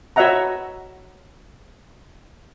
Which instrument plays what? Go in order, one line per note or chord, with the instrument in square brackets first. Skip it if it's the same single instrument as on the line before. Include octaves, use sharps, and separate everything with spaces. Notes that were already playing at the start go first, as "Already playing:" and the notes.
[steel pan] F#4 C#5 D#5 E5 F#5 A#5